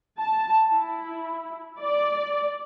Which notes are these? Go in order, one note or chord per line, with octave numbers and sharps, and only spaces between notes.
A5
E4
D5